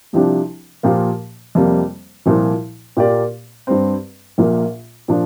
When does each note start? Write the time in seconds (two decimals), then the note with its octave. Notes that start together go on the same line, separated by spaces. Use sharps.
0.13 C2 C3 F3 D4 G4
0.83 A#2 F3 A#3 G4
1.55 F2 C3 G3 A#3
2.26 C2 A#2 F3
2.97 A#2 A#3 G4 D5
3.67 G2 G3 C4
4.38 A#1 A#2 A#3
5.08 A#2 F3 D4